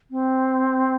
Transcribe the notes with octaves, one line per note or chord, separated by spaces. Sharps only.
C4